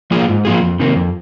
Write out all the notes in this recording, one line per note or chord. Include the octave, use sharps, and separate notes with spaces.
F3 A#3 F4 G#4
G#2
F3 A#3 F4 G#4
F2
C3 D#3 A#3
F2